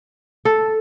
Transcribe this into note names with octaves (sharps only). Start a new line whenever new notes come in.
A4